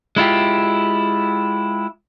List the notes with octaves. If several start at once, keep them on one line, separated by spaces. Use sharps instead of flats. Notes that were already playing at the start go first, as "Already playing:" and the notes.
G#3 E4 F4 G4